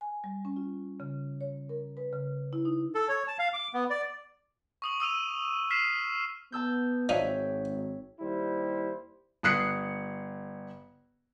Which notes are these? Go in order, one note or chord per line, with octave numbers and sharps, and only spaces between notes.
G#5
G3
C#4
F4
C#3
C#5
A#4
B4
C#3
E4
D#4
A4
C#5
A5
F5
D6
B3
D5
C#6 D#6 F#7
D#6 E6 D#7 F7
F6 B6 C7 E7
B3 A5 E6 G6
G#1 F3 D4 D#4 C#5 E5 G5
D#2 G3 E4 C5
G1 D#6 F#6 C7 C#7